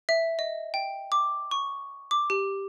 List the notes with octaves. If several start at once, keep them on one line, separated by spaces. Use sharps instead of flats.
E5
D#5
G5
D6
C#6
D6
G4